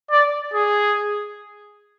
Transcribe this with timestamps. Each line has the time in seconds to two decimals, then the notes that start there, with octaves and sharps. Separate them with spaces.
0.10 D5
0.54 G#4